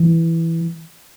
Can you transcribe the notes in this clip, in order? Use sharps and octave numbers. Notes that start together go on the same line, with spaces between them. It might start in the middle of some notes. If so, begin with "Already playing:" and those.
Already playing: E3